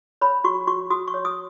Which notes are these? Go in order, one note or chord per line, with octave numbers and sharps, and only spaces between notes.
C#5 B5
F#4 C#6
F#4 C#6
F#4 D#6
C#6
C#5
D#6